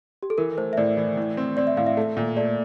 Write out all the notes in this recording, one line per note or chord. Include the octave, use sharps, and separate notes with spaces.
G4
A4
E3 A#4
A3 C5
E5
A2 D5
E3
A2
C4
C4 D5
E5
A2 F5
E5
A3
A#2
A3 D5